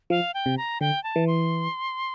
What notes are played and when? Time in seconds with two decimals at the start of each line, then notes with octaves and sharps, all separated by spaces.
0.10 F3 F5
0.34 G5
0.46 C3
0.57 A#5
0.81 D3 G5
1.04 A5
1.16 E3
1.27 C6